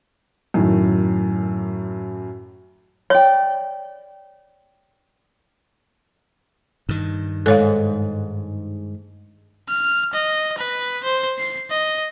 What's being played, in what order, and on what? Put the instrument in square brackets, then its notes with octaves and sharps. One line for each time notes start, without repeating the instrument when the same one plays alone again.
[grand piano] F#2 A2 D#3
[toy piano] C#5 [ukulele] D5 G5
[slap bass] G2 D#3
[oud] G#2 [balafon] A4 C#5 F5
[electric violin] F6
D#5
B4
C5
C7
D#5